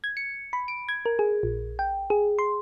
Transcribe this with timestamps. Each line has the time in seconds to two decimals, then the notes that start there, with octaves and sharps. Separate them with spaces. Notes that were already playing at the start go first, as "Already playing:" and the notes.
0.04 G#6
0.17 C#7
0.53 B5
0.68 D7
0.89 G#6
1.06 A#4
1.19 G#4
1.43 A#1
1.79 G5
2.10 G#4
2.39 C6